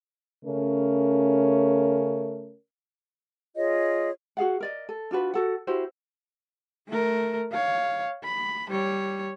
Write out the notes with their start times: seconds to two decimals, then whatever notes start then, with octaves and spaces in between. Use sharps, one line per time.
0.45 C#3 A3 C#4 A#4
3.56 F4 G#4 C#5 D#5
4.37 F#4 G#4 F5 F#5
4.61 A#4 D5 D#5
4.89 A4
5.11 D4 F4 F#4 B4
5.34 F#4 A4 F#5
5.67 E4 F#4 G4 C5
6.89 A3 A#4
7.52 C#5 F5
8.24 B5
8.70 G3 C#5